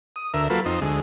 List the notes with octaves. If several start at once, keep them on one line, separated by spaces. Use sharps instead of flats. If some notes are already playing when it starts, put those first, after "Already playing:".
D#6
D2 A#4 E5
F#3 A#3 F4 A4 B4
F2 C4 D#4
D2 G#3